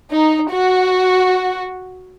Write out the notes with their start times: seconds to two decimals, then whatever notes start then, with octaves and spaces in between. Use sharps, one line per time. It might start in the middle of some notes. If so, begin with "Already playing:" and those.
0.11 D#4
0.50 F#4